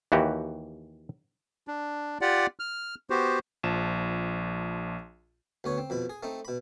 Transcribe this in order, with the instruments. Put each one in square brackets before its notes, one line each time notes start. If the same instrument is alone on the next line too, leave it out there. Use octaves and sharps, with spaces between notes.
[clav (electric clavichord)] D#2 E3 F#4 G4
[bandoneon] D4
F4 G4 D5 F#5
F6
B3 F#4 G4 C5
[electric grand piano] A#1 F3 A5 E7
[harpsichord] D2 B3 C#5
C4
F2 B2 B5
G#4
A3 C4 D#4
B2 B5